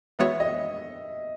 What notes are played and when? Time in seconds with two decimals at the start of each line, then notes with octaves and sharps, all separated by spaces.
0.19 E3 G#3 B3 F#4 C#5 E5
0.40 D#5